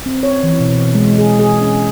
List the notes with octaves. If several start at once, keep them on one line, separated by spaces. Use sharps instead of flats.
C4
C#5
E3
B2
G#3
G#4
G#4
C#4